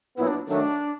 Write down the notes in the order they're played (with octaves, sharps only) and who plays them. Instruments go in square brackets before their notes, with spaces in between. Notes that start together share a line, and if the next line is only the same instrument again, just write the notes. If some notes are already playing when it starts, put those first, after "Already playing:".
[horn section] A#2 F#3 B3 [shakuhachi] E4
[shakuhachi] D4
[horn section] D#3 F#3 A3 [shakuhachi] D4